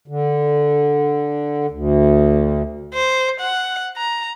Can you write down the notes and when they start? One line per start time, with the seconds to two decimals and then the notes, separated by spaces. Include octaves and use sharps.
0.08 D3
1.70 D2
2.94 C5
3.40 F#5
3.97 A#5